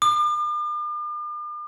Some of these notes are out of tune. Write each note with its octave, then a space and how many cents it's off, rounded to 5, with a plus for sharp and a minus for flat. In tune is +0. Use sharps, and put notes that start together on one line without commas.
D6 +45